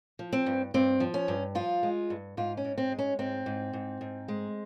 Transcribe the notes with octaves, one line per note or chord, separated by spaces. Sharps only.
F3
C4
G2
G2 C4
F3
C#4
G2
F3 F4
G#3
G2
G#2 F4
C#4
G#2
C4
G#3
C#4
G#2 C4
G#2
G#2
G#2
G#3